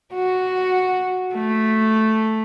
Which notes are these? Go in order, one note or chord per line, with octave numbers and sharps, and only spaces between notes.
F#4
A3